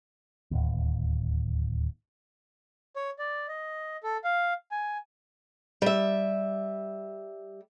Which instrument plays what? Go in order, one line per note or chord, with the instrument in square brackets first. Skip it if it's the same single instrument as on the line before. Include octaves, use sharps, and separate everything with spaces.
[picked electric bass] D1 D#2
[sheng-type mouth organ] C#5
D5
D#5
A4
F5
G#5
[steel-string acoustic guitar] G3 E5